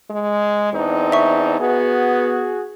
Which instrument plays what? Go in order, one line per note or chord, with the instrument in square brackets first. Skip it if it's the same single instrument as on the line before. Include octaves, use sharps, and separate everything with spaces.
[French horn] G#3
[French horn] E2 [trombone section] C4 D4 D#4
[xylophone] E5 C#6
[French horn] B3 [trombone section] F#4 G#4